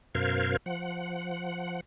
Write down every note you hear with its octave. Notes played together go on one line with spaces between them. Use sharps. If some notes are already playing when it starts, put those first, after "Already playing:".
F#2 B2 A#4 C5 F5 G#6
F3 F#5